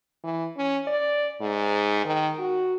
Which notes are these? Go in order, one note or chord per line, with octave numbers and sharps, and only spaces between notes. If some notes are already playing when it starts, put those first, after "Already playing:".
E3
C#4
D5
G#2
D#3
F#4